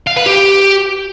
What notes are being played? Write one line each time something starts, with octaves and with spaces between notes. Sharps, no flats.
F5
B4
G4